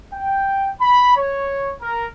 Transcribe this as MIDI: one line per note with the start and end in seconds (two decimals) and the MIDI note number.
0.13 0.70 79
0.81 1.14 83
1.16 1.74 73
1.81 2.06 70